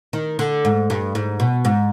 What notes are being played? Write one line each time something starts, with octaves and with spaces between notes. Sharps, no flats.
D#3
D3
G#2
G2
G#2
B2
G#2